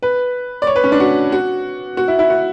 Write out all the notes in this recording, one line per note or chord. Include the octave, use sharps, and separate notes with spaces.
B4
D5
C#5
B4
C#4
D4
F#4
F#4
F#4
E4
E4
F#4